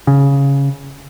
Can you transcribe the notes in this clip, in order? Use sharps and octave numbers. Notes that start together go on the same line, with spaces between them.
C#3